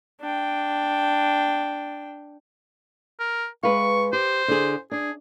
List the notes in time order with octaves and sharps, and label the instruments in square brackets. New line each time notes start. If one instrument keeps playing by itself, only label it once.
[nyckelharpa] D4 G5
[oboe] A#4
[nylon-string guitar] G#3 B4 F5 [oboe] C#6
[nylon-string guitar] G4 [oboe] C5
[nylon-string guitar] D3 G#4
[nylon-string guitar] D4 [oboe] G#4